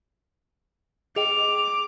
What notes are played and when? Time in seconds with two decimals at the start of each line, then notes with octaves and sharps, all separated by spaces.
1.16 G#4 D#5 G5 D6 F7